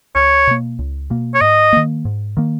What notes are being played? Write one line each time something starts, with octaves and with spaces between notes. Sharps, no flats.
C#2 C#5
B2 A#3
C#2
B2 A#3
C#5
G#2 D#5
D#3 A#3
G#2
D#3 A#3